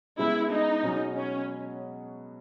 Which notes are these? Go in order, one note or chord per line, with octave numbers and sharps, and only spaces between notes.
C#3 G#3 B3 E4
D#4
B2 F#3 C#4 G#4
C#4